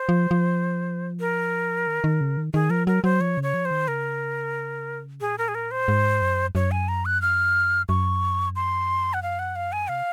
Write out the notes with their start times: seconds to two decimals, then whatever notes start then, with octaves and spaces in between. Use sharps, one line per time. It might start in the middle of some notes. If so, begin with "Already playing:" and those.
Already playing: C5
0.09 F3
0.31 F3
1.20 A#4
1.87 D#3
2.04 D#3
2.21 C#3
2.37 D#3
2.54 D#3 G#4
2.70 F3 A#4
2.87 F#3 A#4
3.04 F#3 C5
3.20 F3 C#5
3.37 C#3
3.43 C#5
3.54 F3
3.65 C5
3.71 D#3
3.88 C#3 A#4
5.21 A#2 G#4
5.38 A#4
5.48 G#4
5.55 A#4
5.71 C5
5.88 G#2
6.22 F#2
6.55 F#2 C#5
6.71 G#5
6.88 A#5
7.05 F#6
7.22 F6
7.89 F#2 C#6
8.56 C6
9.14 F#5
9.23 F5
9.39 F#5
9.56 F5
9.72 G#5
9.89 C3 F5